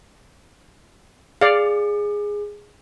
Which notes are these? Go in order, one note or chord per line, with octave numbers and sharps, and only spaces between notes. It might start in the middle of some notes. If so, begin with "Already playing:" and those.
G#4 D5 F5